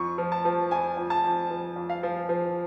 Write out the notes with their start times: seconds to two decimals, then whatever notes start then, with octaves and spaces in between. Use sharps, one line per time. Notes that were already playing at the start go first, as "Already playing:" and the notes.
Already playing: F2 C#6
0.18 F3
0.32 A5
0.45 F3
0.71 F2 G#5
0.97 F2
1.10 A5
1.24 F2
1.51 F3
1.76 F2
1.90 F5
2.03 F3
2.29 F3